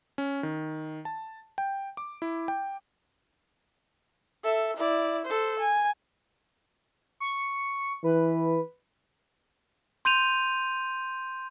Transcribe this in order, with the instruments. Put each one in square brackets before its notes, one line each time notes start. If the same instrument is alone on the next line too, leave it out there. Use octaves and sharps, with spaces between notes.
[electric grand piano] C#4
D#3
A5
G5
D6
E4
G5
[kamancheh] A4 E5
E4 D5
A4 C5
G#5
[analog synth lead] C#6
[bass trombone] E3 [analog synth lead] B4
[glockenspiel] C6 G6 D#7 F7